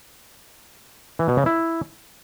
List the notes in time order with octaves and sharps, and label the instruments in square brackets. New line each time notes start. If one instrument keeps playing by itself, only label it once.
[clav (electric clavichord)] E3
B2
C#3
E4